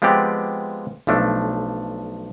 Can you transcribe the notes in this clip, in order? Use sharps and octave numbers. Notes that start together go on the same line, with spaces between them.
F3 G#3 B3 C4 G4 D5
B1 F3 A3 D4